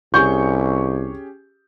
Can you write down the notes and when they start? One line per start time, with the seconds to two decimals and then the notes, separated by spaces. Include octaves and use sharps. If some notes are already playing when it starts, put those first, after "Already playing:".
0.14 C2 C#4 G4 G#4 C#6 G6